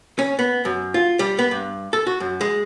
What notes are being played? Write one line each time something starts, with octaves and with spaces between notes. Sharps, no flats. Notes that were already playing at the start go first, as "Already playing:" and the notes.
C#4
B3
F#2
F4
G3
B3
G2
A4
F#4
F#2
G#3